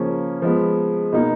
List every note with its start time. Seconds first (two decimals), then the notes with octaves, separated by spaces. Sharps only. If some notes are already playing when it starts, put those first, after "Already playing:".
Already playing: C#3 F3 A#3 C#4
0.42 F3 G#3 B3
1.13 B2 A#3 D#4